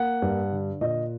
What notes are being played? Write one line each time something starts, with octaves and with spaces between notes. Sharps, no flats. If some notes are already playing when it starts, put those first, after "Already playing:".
Already playing: A#3 F#5
G2
D3
A#2 D#5